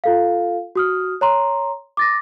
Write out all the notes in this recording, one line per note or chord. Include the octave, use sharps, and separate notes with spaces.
F4 A4 F5
F#4 D#6 F6
C#5 A#5 C6
D6 A6 A#6